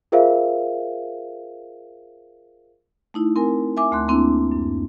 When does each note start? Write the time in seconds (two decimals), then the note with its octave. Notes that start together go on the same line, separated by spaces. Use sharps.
0.12 F4 G#4 A#4 C5 E5 F5
3.14 A3 D#4 E4
3.36 C4 A#4 G#5
3.77 E5 G#5 D6
3.92 D2 A3 C6 F#6
4.08 A#3 C4 D4 E4
4.52 F#2